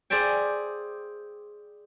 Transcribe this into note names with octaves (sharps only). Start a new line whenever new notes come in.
G#4 C5 D5 E5 G5